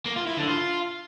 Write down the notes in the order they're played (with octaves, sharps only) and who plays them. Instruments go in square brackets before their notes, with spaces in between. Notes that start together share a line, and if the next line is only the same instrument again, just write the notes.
[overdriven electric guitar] A#3
F4
E4
D3
F4